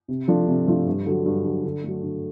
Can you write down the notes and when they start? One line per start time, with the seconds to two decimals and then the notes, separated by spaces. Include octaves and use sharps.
0.08 C3
0.28 F3 A3 D4 F4
0.48 C3
0.67 F3 A3 D4 F4
0.87 G2
1.06 D3 F#3
1.26 G2
1.44 D3 F#3
1.64 D3
1.84 F#3 A3
2.03 D3